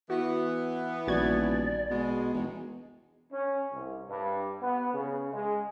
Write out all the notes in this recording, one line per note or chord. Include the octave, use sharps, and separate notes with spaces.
E3 B3 F#4
D#1 A#1 F#4 D5 G#6
B2 G#3
E1 D#4
C#4
C2
G2
B3
C#3
G#3